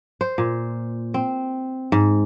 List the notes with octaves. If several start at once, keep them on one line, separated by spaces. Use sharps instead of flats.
C5
A#2
C4
G#2